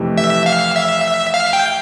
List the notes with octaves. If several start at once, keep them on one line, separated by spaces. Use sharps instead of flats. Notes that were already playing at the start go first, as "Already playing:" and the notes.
Already playing: F2 C3 E3 A3
E5
F5
E5
F5
G5